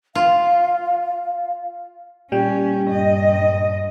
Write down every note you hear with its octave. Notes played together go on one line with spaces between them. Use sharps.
F4 F5
A#2 G3 C#4 G5
G2 D#5